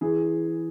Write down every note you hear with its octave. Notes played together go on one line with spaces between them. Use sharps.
E3 G#4